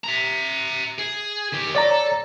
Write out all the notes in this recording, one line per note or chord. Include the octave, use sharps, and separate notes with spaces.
E5 A#5
G#4
D#3 G4
A4 C#5 D5 A#5